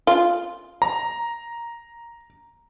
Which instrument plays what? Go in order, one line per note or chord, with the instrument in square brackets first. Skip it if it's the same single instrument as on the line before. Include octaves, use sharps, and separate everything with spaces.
[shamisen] F4
[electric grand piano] A#5